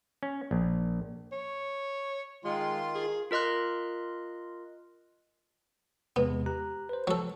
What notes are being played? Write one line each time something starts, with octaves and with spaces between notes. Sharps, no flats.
C#4
A#1
C#5
D#3 G#3 F4 C6
G#4
F4 A#4 D#5 C6 F#6
E2 C3 G#3 B3
G4 A#5 F#6
B4 C5
F3 F#3 A4